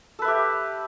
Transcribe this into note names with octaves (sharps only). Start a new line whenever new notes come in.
G4 A4 B4 E5